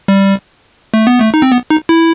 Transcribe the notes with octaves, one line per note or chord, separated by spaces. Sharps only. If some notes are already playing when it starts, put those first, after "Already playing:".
G3
A3
B3
A3
D#4
C4
B3
D#4
E4